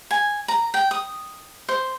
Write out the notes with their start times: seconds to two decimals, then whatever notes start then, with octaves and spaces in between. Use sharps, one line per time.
0.11 G#5
0.48 A#5
0.74 G5
0.91 D#6
1.69 C5